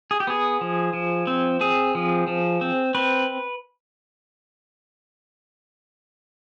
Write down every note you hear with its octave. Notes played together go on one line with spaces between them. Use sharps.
G#4
G4
B3 G#4
F3
F3
C4
C4 G#4
F3
F3
C4
C4 B4